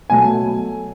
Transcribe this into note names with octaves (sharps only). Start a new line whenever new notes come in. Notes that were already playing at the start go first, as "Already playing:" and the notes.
B2 F#3 A3 G#5